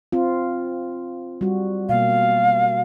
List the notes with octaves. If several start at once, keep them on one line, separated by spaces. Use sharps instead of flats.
C4 F4
G3 F#4
B2 A#3 F5